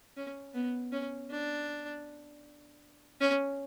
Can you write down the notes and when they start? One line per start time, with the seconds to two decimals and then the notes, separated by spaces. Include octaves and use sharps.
0.16 C#4
0.54 B3
0.92 C#4
1.31 D4
3.21 C#4